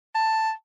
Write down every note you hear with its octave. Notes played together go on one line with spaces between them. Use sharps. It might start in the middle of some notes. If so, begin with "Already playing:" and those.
A5